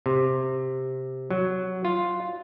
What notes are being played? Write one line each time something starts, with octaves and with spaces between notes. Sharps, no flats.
C3
F#3
F4